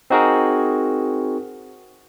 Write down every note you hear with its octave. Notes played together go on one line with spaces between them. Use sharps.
C4 D#4 F#4 G#4 A#4